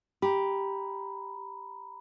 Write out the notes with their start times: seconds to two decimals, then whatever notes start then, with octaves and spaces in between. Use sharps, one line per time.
0.22 G4 A#5 B5